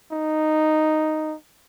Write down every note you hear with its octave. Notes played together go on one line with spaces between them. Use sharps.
D#4